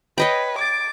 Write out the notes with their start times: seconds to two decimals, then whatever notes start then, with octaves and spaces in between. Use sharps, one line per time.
0.18 B4 C#5 D#5 G5
0.59 D6 G#6 A6 D7